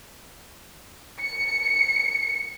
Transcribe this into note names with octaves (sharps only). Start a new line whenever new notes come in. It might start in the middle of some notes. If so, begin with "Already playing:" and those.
C#7